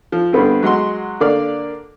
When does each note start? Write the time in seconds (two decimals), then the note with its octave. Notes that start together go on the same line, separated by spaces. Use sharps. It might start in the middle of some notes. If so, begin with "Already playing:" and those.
0.12 F3
0.33 G2 D3 B3 C4
0.63 F#3 G#3 F#5 C6
1.20 D3 A#3 D5 F5